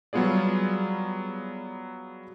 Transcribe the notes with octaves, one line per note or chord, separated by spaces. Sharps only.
F#3 G3 B3 F4 G#4 D5